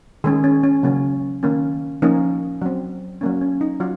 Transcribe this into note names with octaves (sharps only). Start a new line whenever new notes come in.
D#3 G#3 C#4 G#4
C#4
C#4
C#3 F#3 A#3 C#4
D#3 A#3 C#4
F3 A#3 C#4 D#4
F#3 C4
F#3 A#3 C#4
C#4
D#4
F#3 F4